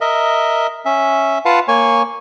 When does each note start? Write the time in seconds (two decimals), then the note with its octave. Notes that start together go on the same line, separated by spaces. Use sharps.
0.01 A#4 D#5 E5
0.85 C#4 E5
1.45 F4 B4 F5 F#5 A5
1.68 A#3 C#5 G#5 C#6